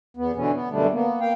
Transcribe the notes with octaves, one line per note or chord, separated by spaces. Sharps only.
E2 B3
B2 D3 E3 C#4
B3
F#2 B2 D3 G3 A3 D4
A#3 B3
A#3 F5 G5